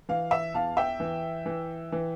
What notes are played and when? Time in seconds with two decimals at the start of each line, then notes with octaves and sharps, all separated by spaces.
0.09 E3 F5
0.31 E5
0.54 E2 F5 A5
0.77 E5 G5
1.00 E3
1.46 E3
1.92 E3